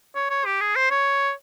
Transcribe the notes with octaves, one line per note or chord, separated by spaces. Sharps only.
C#5
C#5
G4
G#4
C5
C#5